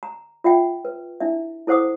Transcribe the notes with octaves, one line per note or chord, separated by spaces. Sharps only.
A#5
F4 E5 F#5 G5
B4
D4 E4 E5
E4 A4 C5 F#5 D6 D#6